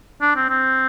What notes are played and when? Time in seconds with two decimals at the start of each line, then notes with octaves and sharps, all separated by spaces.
0.22 D4
0.36 C4
0.50 C4